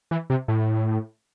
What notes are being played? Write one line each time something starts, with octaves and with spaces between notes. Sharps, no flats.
E3
C3
A2